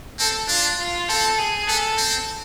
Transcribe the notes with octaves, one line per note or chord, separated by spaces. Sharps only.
C4 A4
D4 F4
F4
C4 A4
G#4
B3 A4
C4